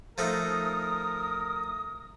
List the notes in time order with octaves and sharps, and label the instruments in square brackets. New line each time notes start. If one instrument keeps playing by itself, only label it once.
[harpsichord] F3 A3 D#4 [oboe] A#4 [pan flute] D#6